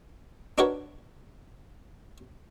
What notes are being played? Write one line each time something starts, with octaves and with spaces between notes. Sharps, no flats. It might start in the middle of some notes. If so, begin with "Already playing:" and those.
D4 D#4 F#4 A#4 B4 C#5